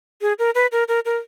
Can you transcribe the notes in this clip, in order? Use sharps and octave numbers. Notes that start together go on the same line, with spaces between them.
G#4
A#4
B4
A#4
A#4
A#4